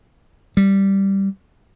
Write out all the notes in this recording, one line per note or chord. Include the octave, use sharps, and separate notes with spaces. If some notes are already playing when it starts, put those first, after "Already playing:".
G3